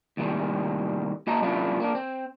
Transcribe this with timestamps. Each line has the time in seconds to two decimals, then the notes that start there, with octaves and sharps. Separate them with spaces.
0.17 D#2 A2 C3 D#3 G3
1.27 A#3 F#4 D#5 A5 A#5
1.42 F#2 C3 A#3 D4 E4 F4
1.80 A#3 D4
1.95 C4